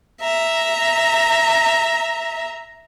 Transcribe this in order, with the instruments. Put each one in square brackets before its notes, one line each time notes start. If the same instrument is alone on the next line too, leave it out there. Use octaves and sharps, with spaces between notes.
[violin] E5 A#5